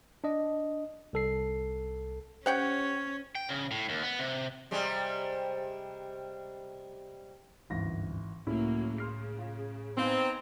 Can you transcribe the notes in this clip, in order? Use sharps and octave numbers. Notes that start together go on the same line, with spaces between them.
D4 D#5
C2 A4 C7
C#4 G4 C5 C#5 F#5 G5
G5
C#3
A2
D#2
B3
C3
C3 G3 G#3
G#1 D2 G2 E3 C#4 A#6
C#2 A2 F#3 A3 A#3 C#4 E4
C#3 C6 F6 C7
F4
B3 C4 D#4 F5 G#5 A#5